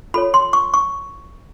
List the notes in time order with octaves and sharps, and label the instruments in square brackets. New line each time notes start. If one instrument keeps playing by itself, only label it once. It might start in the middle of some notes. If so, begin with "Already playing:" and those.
[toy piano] F4 A4 C#5 B5
C6
C#6
C#6